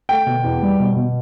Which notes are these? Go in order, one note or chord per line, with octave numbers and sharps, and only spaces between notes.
A3 G5
B2
E2
G3
B2
B2